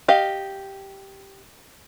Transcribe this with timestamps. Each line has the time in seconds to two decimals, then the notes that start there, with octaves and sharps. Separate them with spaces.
0.08 G4 D#5 F5